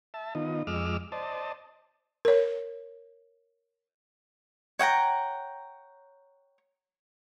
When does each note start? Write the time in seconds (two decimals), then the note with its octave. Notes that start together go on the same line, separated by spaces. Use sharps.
0.14 E5 A5
0.35 D#3 B3 D#4 F4 D#5
0.67 F2 G#3 D#5 D6 E6 F6
1.12 C5 D5 D#5 A5
2.25 A#4 C#5
4.79 C#5 F#5 G5 A#5